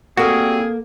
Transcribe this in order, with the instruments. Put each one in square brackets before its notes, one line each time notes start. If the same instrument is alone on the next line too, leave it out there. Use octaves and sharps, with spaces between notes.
[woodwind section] G3 C4 G#4 [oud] A#3 A4 [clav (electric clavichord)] F#4